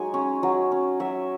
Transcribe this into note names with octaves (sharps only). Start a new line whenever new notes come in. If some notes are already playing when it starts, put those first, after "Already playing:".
Already playing: F#3 G#3 D#4 G#5
C#4
F#3
C#4
F#3 E5